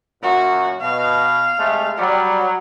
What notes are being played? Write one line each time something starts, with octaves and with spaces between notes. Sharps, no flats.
F#2 A#2 F#4
B2 F5
C3 G#3 A3
F#3 G3